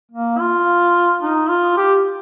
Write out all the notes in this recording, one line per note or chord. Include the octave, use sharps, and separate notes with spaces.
A#3
F4
D#4
F4
G4